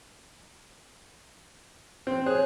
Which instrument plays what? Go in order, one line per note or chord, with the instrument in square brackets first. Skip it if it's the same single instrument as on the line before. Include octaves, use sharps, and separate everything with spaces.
[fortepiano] C4
[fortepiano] G#4 [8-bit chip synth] C5 C#5 F#6